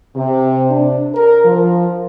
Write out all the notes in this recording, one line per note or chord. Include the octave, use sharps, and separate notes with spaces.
C3
D4
A#4
F3